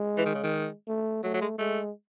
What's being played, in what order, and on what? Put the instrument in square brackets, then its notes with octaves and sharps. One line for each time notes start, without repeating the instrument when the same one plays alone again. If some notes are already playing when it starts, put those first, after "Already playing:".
Already playing: [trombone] G#3
[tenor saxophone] E3
D#3
C#3
D#3
[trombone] A3
[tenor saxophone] F#3 [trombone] A3
[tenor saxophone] F#3
G#3
[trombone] G#3 [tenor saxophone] A3